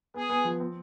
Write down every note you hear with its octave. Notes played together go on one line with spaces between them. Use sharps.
B3 G#4
B3
F3
C4